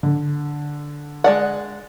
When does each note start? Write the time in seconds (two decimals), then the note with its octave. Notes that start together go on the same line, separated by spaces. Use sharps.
0.03 D3
1.24 G#3 D5 F#5